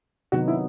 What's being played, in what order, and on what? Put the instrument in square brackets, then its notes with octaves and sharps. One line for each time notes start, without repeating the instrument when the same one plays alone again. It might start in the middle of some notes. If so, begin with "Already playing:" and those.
[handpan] C3 D#3 F#3 B3 D#4 [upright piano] F#4
[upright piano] E4